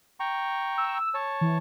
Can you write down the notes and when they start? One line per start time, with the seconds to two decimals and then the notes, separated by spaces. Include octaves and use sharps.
0.20 G5 A#5 C#6
0.78 E6
1.14 C#5 A5
1.41 E3